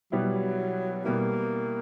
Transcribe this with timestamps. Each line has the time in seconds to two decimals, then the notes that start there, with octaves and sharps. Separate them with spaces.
0.11 B2 F#3 G3 B3 E4
1.05 B2 G3 A#3 B3 E4